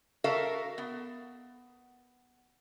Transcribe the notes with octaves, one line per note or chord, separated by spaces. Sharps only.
F#4 A4 A#4 E5 F5
B3